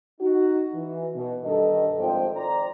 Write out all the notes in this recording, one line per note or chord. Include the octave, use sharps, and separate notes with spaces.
D#4 F#4
E3
B2
G2 D#3 A4 D#5
G#1 F3 D4 C5 G5
C5 D5 A#5